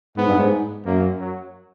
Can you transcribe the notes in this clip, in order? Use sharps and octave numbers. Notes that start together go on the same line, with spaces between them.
G#2 B3
G2
G#2
F#2 A#3
F#3